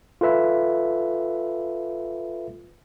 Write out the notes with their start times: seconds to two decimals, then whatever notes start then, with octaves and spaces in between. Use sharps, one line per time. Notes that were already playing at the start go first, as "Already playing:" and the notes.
0.21 F4 A4 B4 E5